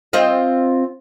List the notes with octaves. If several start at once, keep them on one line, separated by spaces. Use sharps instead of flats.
C4 F4 D#5